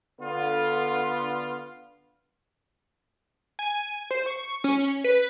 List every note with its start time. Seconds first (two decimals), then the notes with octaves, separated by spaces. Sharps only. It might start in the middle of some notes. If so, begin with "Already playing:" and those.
0.21 D3 B3 F4
3.59 G#5
4.11 C5
4.26 C#6
4.64 C#4
5.04 B4